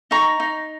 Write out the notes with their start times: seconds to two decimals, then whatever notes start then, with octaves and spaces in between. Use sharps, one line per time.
0.11 D#4 A#5 C#6
0.40 D#4